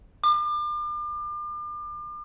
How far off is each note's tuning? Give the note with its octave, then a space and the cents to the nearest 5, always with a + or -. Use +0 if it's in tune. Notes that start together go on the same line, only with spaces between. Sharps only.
D6 +40